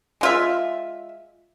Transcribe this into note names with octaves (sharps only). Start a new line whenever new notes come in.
G#3 F4 E5